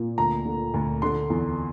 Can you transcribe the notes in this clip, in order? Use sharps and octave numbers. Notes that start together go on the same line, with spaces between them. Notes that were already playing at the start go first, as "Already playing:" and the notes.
Already playing: A#2
D2 A#5
D3
D2
D3 C6
E2